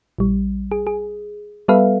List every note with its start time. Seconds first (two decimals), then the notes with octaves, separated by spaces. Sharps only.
0.18 A#1 G3
0.72 G#4
0.87 G#4
1.68 G3 B3 A4 B4 E5 F5